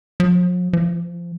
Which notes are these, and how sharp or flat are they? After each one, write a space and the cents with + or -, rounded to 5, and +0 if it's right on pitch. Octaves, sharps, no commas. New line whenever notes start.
F3 +45
F3 -20